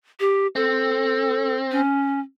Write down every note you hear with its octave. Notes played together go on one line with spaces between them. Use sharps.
G4
C4 A4
C#4